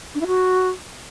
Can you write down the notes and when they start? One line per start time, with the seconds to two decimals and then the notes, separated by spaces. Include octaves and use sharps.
0.15 D4
0.21 E4
0.27 F#4